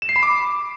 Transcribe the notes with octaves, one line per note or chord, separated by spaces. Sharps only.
E7
C7
B5
D6